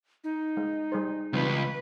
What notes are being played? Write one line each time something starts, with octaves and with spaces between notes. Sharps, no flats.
D#4
G#3
G3 G#4 C5
C#2 E3 G3 C4 B4